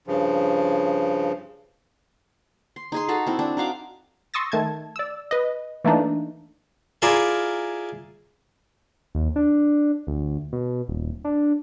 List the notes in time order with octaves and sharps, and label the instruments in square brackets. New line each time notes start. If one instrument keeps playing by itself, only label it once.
[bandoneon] G2 C#3 F3
[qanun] C6
D#4 G#4 C6
F#4 A4 A#5
C4 E4
C4 D4
D#4 F#4 F5 D6
[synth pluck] C6 C#6 D#6 E6 A6 A#6
D#3 A3 A5 G#6
D5 E6
B4 D#5
E3 A3 A#3 D4 D#4
[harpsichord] E4 F4 G#4 A#4 D5 E5
[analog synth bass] D#2
D4
D2
B2
D#1
D4